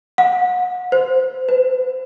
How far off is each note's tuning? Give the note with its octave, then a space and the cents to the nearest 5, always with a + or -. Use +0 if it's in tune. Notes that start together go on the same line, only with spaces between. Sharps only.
F#5 -35
C5 -15
B4 +40